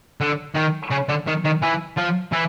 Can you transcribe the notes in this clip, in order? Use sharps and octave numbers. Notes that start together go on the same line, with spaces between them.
D3
D#3
C#3
D3
D#3
D#3
E3
F3
E3